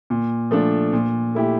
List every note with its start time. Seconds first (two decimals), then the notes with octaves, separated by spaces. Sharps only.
0.10 A#2
0.51 F3 A3 D4
0.93 A#2
1.35 A3 E4 G4